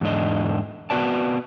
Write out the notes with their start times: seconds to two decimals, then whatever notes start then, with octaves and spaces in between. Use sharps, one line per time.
0.01 E2 G#2 D3 D4 D#5
0.90 B3 F#4 B4 D5 A5